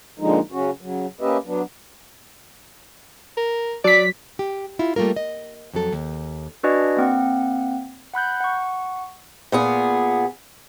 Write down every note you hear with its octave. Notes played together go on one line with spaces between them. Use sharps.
A#2 D3 F3 G#3 D#4
C#3 F#3 C#4 F#4
C#3 F#3
A#3 C#4 G4 B4 D#5 E5
F#3 B3 D4
A#4
F#3 D5 B6
G4
E4 F4
G3 A3 A#3 F4 A#4
D#5
F2 F#3 A4
D#2
D4 F#4 B4 D5 D#5 G#5
A#3 C4 F#5
F#5 B5 F#6 G6
F#5 C#6
A#2 B3 G#4